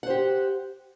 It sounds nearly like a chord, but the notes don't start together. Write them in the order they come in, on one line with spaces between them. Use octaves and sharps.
F#5 C5 G4